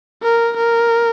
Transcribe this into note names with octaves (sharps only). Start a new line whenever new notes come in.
A#4
A#4